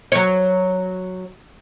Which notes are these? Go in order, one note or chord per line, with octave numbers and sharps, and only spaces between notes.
F#3 C#5